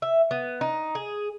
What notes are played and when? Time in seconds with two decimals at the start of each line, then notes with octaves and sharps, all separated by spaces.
0.02 E5
0.31 B3
0.61 D#4
0.95 G#4